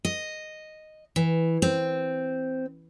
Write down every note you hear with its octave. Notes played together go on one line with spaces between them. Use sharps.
D#5
E3
C4